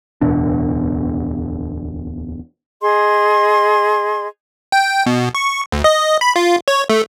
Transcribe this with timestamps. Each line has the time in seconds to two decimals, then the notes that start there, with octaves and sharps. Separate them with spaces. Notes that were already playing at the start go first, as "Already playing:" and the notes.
0.21 D1 E2 B2 D4
2.81 G#4 D#5 C6
4.72 G5
5.06 B2
5.35 C#6
5.72 D2
5.84 D#5
6.21 B5
6.36 F4
6.68 C#5
6.89 A3